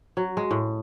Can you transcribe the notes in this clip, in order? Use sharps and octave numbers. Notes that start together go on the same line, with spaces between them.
F#3
G#3
A2